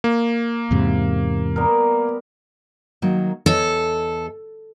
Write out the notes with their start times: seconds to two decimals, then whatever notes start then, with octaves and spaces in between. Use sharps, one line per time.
0.04 A#3
0.71 E2 G#2 C3
1.56 G3 B3 A#4
3.02 D#3 F#3 A#3
3.46 E2 A4 C#5 D#5